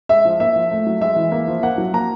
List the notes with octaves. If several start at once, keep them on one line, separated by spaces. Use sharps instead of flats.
G#3 E5
F3
A#3 E5
F3
A3
F#3
G#3 E5
E3
A#3
F3
A#3 F#5
F#3
A#3 A#5